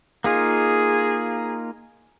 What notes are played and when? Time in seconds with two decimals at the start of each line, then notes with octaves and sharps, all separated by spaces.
0.24 A#3 D#4 F4 G#4